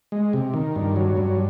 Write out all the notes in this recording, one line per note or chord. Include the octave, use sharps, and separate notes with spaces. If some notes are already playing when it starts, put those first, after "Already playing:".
G#3
C3
D#3
G2
F#3
G2